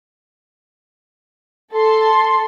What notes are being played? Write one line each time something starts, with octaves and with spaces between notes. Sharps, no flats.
A4 C6